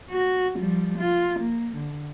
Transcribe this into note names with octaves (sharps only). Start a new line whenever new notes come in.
F#4
F3 G3
F4
A#3
D3